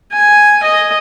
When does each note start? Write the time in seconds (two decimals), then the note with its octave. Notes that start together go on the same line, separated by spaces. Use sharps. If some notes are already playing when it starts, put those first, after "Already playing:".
0.13 G#5
0.63 D#5